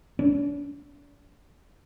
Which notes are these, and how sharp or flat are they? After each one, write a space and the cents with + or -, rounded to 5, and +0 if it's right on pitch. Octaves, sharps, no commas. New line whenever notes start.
D4 -45